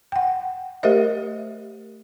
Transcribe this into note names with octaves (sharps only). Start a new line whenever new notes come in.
F#5 G5
A3 G4 A#4 C5 D#5 E5